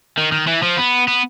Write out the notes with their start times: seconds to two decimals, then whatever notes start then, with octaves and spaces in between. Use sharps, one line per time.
0.17 D#3
0.32 D#3
0.47 E3
0.63 F3
0.78 B3
1.08 B3